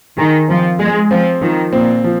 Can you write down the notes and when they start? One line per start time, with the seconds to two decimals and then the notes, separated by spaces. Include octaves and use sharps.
0.18 D#3 G#4
0.48 F3 C4
0.79 G#3 G#4
1.11 F3 C4
1.42 D#3 F3
1.73 A#2 C4
2.04 F3